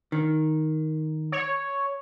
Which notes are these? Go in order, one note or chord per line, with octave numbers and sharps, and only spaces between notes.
D#3
C#5